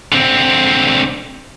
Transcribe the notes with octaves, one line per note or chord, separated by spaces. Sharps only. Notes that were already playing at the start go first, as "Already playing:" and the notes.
D3 C4